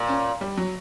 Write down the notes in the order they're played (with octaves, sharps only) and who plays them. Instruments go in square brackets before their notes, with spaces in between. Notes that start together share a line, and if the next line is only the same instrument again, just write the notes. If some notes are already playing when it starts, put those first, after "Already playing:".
Already playing: [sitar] A#2
[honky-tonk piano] C#4
G3
F#3